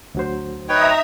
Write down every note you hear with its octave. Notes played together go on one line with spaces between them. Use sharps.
D2 F#3 C5
D#4 B4 C#5 E5 G5 A#5 D#6